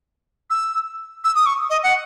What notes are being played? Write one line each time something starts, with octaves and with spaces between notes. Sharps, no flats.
E6
E6
D#6
C#6
D#5
F#5